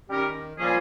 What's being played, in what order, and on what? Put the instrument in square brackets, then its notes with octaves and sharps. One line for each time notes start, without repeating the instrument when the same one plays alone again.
[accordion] D#3 [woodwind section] G3 C#4 G4 A#4
[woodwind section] A#2 G3 A#3 C#4 G#4 [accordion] F3